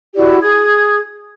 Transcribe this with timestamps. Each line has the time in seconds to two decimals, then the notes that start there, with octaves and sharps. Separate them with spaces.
0.16 E4 F#4 G4 D5
0.41 G#4 D#6 G#6